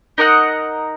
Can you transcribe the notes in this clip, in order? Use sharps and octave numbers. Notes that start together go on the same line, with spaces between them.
D#4 A#4 D#5 F#5